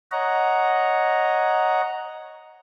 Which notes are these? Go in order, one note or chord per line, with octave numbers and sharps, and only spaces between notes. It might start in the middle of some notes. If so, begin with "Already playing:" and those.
C#5 D#5 F#5 A#5